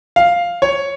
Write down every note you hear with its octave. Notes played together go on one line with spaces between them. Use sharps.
F5
C#5